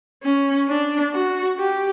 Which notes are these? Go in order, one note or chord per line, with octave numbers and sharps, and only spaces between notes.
C#4
D4
F#4
G4